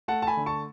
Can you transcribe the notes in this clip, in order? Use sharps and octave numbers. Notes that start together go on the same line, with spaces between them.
A3 F#5 A5
A5
G#5 B5
D3
A5 C#6